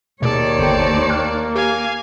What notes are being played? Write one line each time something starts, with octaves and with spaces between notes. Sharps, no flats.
D#2 B2 G#4 C#5 D5 A5
G1 D3 C5 G5
A#3 G5 F6 F#6
G4 F5 G#5